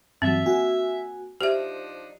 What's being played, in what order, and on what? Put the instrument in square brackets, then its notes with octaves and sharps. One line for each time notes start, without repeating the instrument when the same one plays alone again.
[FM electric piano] G2 E3 F#3 [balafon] C4 [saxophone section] E5
[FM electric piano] A#3 F#4 G#5
[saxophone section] F3 D4 D#4 [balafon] G4 E5 [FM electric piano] C5